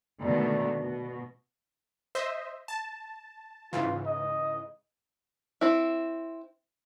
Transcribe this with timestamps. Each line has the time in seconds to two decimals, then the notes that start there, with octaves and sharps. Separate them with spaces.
0.22 B2 D3 D#3 G#3 A3
0.81 B2
2.15 C5 D#5 E5
2.68 A5
3.73 G#2 C#3 E3 F4
4.06 D#5
5.61 C4 E4